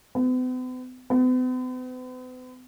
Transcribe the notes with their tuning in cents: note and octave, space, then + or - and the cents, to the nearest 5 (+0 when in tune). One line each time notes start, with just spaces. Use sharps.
B3 +45
B3 +45